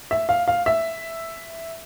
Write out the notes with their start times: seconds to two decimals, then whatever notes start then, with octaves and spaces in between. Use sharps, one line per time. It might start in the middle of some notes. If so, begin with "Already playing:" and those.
0.11 E5
0.29 F5
0.48 F5
0.66 E5